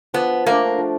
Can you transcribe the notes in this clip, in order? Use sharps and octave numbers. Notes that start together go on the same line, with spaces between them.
F3 B3
A3 A#3 D4
F3